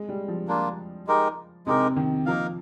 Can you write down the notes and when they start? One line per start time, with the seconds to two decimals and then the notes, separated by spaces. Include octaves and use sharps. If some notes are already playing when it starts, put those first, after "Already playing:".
Already playing: G#3
0.09 G3
0.28 F3
0.48 A#3 D4 F4
1.07 G#3 D#4 G4 A#4
1.67 C3 G#3 D#4 G4 A#4
1.96 D#3
2.26 F3 A#3 D#4 A#4 F5